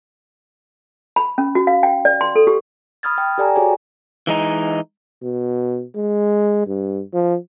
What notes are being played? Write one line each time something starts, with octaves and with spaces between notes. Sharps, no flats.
B5
C#4
F#4
F5
G5
D5
C6
A4
G4
B5 D#6 F6 G#6 A6
G5
G4 A4 D5 G5 G#5 A#5
F#4 G#4 C#5 G#5
E3 G#3 D#4
B2
G#3
G2
F3